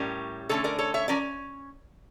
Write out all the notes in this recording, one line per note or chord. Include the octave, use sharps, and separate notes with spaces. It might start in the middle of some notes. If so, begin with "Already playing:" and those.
Already playing: A2 G3 C#4 G4 A#4
D3 A3 C#4 A4 C#5
A#4 D5
A4 C#5
C#5 E5
F3 C#4 A#4 D5